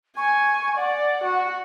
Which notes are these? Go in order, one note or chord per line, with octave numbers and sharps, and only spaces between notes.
G#5 C#6
D5 F#5
F#4